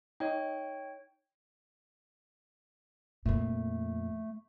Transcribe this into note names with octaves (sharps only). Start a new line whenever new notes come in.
D#4 C#5 G5
F2 A#2 A3